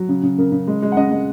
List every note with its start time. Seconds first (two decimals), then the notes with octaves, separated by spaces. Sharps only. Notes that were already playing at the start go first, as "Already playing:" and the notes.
Already playing: F#3
0.09 C#3
0.23 C#3
0.38 C#3 A#4
0.52 C#3
0.67 G#3
0.82 G#3
0.92 F#5
0.96 C#3 D#5
1.11 G#3